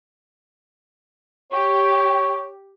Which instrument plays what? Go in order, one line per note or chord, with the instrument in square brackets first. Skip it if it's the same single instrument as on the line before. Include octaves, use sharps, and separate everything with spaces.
[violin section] G4 [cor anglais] C#5